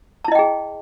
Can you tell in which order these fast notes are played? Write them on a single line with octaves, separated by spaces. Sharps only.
A5 E4 D#5 G5 G#4